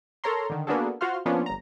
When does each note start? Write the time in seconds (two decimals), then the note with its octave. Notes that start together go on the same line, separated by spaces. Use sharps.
0.24 A4 A#4 C#5 A#5 C6
0.50 D3 D#3
0.67 A#3 B3 D4 F#4 G#4 A4
1.01 F4 F#4 C5 F5 C6 F6
1.26 F3 A#3 B3 C#4 D4 F4
1.46 G1 A#5